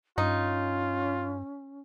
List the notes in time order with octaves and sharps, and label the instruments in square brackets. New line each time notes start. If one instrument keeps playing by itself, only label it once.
[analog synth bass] G2 [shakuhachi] C#4 [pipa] D#4 [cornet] F4